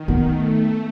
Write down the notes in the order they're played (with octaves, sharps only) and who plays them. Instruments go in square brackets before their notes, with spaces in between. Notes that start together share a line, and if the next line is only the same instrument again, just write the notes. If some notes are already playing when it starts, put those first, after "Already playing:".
Already playing: [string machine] D#3
[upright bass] B3
[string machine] A3